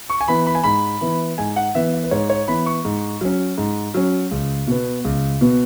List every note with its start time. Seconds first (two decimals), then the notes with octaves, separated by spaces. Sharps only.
0.10 C#6
0.21 G#5
0.28 E3 B3 B5
0.47 B5
0.55 G#5
0.64 G#2 B5
1.01 E3 B3
1.38 G#2 G#5
1.56 F#5
1.75 E3 B3 E5
1.93 E5
2.04 B4
2.11 G#2 C#5
2.30 C#5
2.48 E3 B3 B5
2.66 C#6
2.85 G#2
3.21 F#3 C#4
3.58 G#2
3.94 F#3 C#4
4.31 C#2
4.68 B2 B3
5.04 C#2
5.41 B2 B3